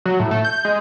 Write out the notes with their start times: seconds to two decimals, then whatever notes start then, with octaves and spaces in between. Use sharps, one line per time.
0.05 F#3
0.20 A2
0.31 A3
0.45 G6
0.65 G#3